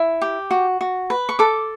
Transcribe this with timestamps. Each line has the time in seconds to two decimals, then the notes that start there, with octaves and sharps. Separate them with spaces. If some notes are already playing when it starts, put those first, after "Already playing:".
Already playing: E4
0.22 G4
0.51 F#4
0.81 F#4
1.10 B4
1.29 C#6
1.39 A4 D6